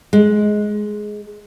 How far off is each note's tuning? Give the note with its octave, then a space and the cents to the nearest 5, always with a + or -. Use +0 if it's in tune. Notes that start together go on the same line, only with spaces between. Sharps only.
G#3 +10